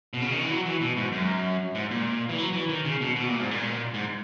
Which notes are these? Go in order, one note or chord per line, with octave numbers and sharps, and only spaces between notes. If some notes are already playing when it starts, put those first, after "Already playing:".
B2
C#3
D#3
E3
F#3
E3
B2
G#2
F#2
G#2
A#2
E3
F#3
E3
D#3
C#3
B2
B2
A#2
G#2
A#2
G#2